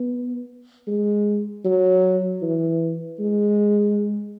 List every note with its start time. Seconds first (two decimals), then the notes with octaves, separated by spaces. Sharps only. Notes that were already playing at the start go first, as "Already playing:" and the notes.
Already playing: B3
0.87 G#3
1.65 F#3
2.42 E3
3.20 G#3